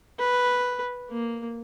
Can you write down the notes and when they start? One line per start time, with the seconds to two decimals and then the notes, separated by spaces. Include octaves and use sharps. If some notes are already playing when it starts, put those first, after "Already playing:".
0.19 B4
1.10 A#3